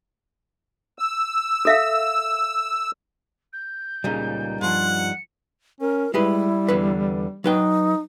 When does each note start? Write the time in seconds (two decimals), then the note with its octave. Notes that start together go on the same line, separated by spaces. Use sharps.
0.99 E6
1.65 A4 E5 F5
3.52 G6
4.04 C#2 A#2 C#3 G3 D#4 A#4
4.61 G2 F3 F#5 C6
4.97 C#7
5.81 C#4 A#4
6.14 G3 G#3 E4 G4 B4
6.68 E2 D3 B4
7.44 F#3 D#4 B4 G5